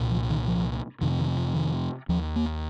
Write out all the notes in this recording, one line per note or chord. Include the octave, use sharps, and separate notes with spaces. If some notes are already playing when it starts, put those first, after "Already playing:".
Already playing: C2 A#2
F3
D#3
F3
F2 C3 D#3
D#3
F3
D#3
D#2 F3
A#3